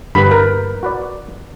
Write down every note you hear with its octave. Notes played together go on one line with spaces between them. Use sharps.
G2 D3 G3 B4 B5
A#4
F#4 B4 D5